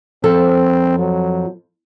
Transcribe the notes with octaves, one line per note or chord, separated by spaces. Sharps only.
F2 F3 C4 A4
F#3